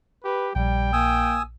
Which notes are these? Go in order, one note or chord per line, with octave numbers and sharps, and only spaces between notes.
G4 B4
A#1 G3 G5
A#3 G#5 D#6 E6